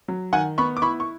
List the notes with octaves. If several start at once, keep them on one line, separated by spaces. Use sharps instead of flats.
F#3
D#3 F#5 G#5
B3 B5 C#6
D6
E4 B5 C#6
C#6